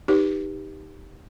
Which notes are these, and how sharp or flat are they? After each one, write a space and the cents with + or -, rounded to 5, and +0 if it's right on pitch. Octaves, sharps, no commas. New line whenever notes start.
D#4 +0 G4 +0 B4 -15